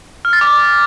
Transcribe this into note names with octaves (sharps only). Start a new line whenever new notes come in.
F6
A6
D6